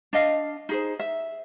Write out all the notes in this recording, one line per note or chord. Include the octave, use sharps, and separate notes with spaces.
D4 D#5 F5
D#4 G#4 C5
E5